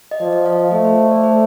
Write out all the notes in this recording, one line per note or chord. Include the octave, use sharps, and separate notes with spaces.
D#5
F3 D5
D#5
F5
D#5
A3 C5
C5
C5
D5
C5